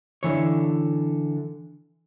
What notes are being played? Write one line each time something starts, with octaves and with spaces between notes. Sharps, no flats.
D3 E3 C#5